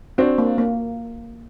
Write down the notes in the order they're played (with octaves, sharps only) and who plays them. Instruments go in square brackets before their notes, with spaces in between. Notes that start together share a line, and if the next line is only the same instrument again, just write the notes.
[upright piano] C4 D4 [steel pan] F#4
[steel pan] A#3
A#3